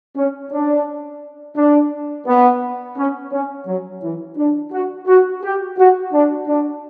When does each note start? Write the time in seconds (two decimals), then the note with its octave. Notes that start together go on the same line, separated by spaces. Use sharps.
0.16 C#4
0.51 D4
1.56 D4
2.27 B3
2.97 C#4
3.32 C#4
3.67 F#3
4.03 E3
4.37 D4
4.72 F#4
5.07 F#4
5.43 G4
5.78 F#4
6.13 D4
6.48 D4